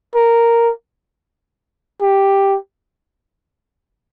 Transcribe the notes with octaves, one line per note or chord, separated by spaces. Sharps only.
A#4
G4